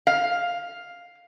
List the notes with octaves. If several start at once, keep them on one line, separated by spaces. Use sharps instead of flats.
F5